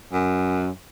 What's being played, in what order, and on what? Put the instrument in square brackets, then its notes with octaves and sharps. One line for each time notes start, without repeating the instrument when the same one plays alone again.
[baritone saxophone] F#2